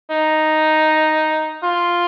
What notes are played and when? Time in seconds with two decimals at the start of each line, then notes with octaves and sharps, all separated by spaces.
0.10 D#4
1.63 F4